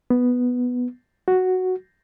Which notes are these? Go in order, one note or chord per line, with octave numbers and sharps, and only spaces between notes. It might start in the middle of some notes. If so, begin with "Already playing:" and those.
B3
F#4